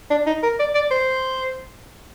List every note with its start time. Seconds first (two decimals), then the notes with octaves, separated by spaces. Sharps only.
0.11 D4
0.27 D#4
0.43 A#4
0.59 D5
0.75 D5
0.91 C5